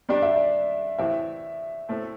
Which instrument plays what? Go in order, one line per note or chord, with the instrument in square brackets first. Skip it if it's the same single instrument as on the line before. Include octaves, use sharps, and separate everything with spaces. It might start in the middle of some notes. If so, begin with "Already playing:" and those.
[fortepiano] G2 G3 D4 G4 [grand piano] D5
[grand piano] E5
D5
[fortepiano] A2 E3 C4 G4 [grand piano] E5
[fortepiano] A2 A3 C4